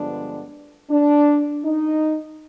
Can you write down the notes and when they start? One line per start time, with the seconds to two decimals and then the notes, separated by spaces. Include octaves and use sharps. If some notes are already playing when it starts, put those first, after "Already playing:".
Already playing: G2 D3 F3 G#3 B3 D4
0.90 D4
1.65 D#4